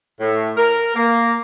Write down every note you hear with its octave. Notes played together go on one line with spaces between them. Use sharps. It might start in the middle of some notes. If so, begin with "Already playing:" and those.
A2
A#4
A#3